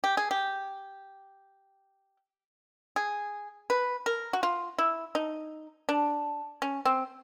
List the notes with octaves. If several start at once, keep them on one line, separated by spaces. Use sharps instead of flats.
G4
G#4
G4
G#4
B4
A#4
F#4
F4
E4
D#4
D4
C#4
C4